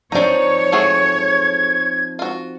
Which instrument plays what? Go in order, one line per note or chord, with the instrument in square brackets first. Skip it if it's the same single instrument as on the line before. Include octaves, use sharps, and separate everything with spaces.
[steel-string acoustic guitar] F3 C4 D#4 [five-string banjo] D4 A#5 [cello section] C#5
[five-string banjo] A3 F#4 G#4 [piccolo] G#6
[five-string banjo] F4 F#4